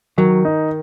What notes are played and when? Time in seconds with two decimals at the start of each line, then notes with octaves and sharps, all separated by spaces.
0.18 D#3 F#3
0.45 D#4